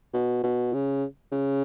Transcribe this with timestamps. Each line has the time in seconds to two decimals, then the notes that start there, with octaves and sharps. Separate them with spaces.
0.14 B2
0.44 B2
0.73 C#3
1.32 C#3